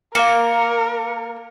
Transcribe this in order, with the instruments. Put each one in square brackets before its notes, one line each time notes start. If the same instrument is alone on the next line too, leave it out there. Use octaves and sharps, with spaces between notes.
[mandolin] A#3 [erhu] A#4 [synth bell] F5 C#7